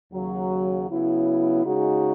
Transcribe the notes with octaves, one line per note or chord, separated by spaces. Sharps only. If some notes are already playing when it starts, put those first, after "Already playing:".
D#2 C#3 F#3
C#3 F#3 B3 E4
C#3 G#3 D#4 F#4